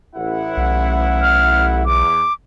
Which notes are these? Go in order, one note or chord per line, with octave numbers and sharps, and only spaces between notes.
A1 E4 F#5
B1
F6
E2 D6